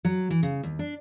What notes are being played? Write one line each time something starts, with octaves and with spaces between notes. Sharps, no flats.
F#3
E3
C#3
D#2
D4